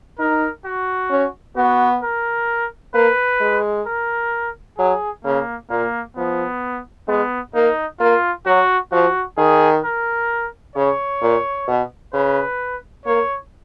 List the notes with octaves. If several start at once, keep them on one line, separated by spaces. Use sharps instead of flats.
D#4 A#4
F#4
C#4
B3 F#4
A#4
A#3 B4
G#3
A#4
F#3 G#4
C#3 A#3
A#2 A#3
F3 B3
G#3 B3
A#3 D#4
A#3 F4
F#3 F#4
F3 F#4
D#3 G#4
A#4
C#3 C#5
A#2
B2
C#3 B4
A#3 C#5